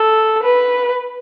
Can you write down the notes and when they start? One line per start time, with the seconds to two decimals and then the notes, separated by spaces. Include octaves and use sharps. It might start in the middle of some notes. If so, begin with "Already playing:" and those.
Already playing: A4
0.42 B4